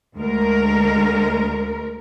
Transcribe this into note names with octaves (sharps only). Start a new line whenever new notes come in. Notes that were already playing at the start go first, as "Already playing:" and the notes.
D2 G#3 A#4